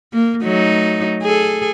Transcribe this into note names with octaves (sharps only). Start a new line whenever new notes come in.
A#3
F#3 A3 D#4
G#4 A4